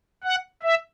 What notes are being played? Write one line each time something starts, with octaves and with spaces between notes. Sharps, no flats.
F#5
E5